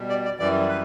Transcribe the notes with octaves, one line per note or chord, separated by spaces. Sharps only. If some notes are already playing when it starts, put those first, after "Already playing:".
Already playing: B2 G3
D5
D5
F#2 E3 G3 D5
B4